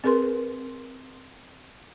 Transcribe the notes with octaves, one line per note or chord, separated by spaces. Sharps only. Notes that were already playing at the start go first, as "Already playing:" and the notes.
C4 G#4 A#4 B4 C6